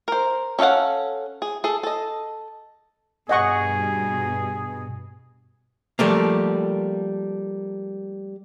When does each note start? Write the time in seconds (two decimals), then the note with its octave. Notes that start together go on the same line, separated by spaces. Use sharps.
0.08 A#4 C5
0.59 C#4 A4 D#5 F5 F#5
1.42 G#4
1.64 G#4 A4
1.83 A4 D#5
3.29 G2 B2 G#4 D#5 F#5 C#6
5.99 F3 G3 A3 A#3